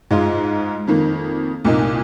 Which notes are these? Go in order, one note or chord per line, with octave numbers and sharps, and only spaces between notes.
G#2 G#3 F4
F2 D#3 A#3
C2 A#2 A#3 D#4